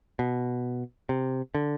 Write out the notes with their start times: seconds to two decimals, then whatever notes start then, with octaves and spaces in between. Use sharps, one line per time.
0.19 B2
1.09 C3
1.55 D3